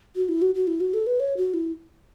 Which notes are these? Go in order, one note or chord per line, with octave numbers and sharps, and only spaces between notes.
F#4
E4
F#4
F#4
E4
F#4
A4
B4
C#5
F#4
E4